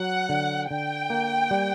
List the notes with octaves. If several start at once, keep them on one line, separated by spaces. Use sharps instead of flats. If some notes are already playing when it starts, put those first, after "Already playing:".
Already playing: F#3 F#5
D3
D3 G5
A#3
G3